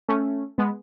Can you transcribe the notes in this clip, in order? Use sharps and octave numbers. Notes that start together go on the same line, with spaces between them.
A3 C#4
G#3 B3